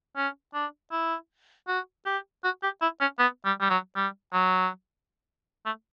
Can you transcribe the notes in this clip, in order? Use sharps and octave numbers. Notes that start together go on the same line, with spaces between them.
C#4
D4
E4
F#4
G4
F#4
G4
E4
C#4
B3
G3
G3
F#3
G3
F#3
A3